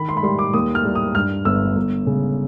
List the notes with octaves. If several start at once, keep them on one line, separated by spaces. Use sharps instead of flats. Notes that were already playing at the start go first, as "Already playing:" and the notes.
Already playing: D#3 B5
C6
B5
G3 C6
D6
D#2 D#6
F6
G3
D#6
G2 F6
G1 E6
G1
C#3